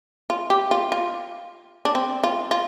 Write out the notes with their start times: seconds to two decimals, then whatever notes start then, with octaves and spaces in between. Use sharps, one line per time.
0.30 F4
0.50 G4
0.71 F4
0.92 F4
1.85 D4
1.95 C4
2.24 F4
2.51 F4